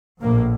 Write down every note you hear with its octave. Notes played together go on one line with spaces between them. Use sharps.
A#1 A2 A#3